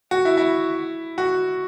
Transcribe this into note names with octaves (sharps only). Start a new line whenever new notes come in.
F#4
E4
E4
F#4